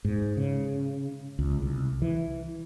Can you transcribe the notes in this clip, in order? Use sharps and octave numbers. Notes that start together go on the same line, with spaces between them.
G#2
C#3
C#2
C2
E3